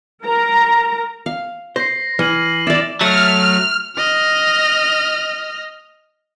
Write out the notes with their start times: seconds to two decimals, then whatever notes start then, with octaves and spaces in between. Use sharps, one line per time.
0.24 A#4 A#5
1.26 F5
1.76 C5 A#6 C7
2.19 E3 F6 D#7 F#7
2.67 E4 D5 D6 A6 E7
3.01 F#3 A3 F6
3.96 D#5 F6